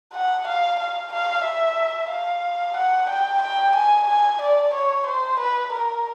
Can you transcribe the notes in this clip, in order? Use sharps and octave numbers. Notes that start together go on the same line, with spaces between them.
F#5
F5
F5
F5
E5
F5
F#5
G5
G5
G#5
G#5
D5
C#5
C5
B4
A#4